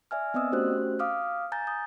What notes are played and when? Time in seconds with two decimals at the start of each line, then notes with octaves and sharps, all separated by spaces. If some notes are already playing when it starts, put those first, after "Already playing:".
0.11 D5 E5 G#5 F6
0.34 B3 C4 D5 D#5 D#6 E6
0.52 A3 C#4 F#4 G4 C5 F#6
0.99 F5 D6 D#6 F6
1.52 G#5 A#5 G6 A6
1.67 D#6 G6